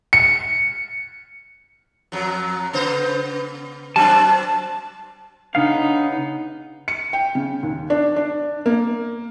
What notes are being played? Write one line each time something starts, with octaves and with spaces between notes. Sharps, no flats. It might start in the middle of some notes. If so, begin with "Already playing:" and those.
C#7
F2 F#3
C#3 B3 C5
F#3 C4 D4 A5
C#3 B3 D4 D#4 F5
C#7
G5
C#3
D#2
D4
D4
A#3